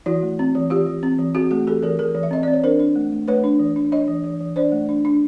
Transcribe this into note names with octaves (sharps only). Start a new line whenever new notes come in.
E3 E4 F#4
A3
C4
E3
E3 F4 G4
E3
C4
E3
C4 F#4 G#4
A3 F#4 G#4
E3 G4 A4
E3 G#4 A#4
E3 G#4 A#4
E3
E5
C4 D#5
C4 D5
C#5
D4 A#4 C5
D4
A3
A3
A3 B4 C#5
D4
E3
D4
D4 C#5 D#5
E3
E3
E3
D4 C5 D5
A3
D4
D4